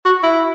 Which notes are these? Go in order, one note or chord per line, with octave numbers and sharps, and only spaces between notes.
F#4
E4